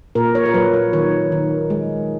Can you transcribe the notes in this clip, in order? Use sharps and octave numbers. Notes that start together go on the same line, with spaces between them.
A#2 A#4
C#5
A#4
F#3 B4
C#5
D#3 C#5
D#3
G#3